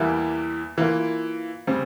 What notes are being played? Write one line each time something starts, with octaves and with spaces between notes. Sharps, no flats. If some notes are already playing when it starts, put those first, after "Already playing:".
Already playing: E2 E3 G3 A#3 E4
E3 A#3 F4
C#3 G3 C4